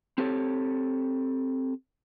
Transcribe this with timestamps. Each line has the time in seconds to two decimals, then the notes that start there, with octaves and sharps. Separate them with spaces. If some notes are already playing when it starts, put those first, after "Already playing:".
0.18 C4 G4 A4 C#5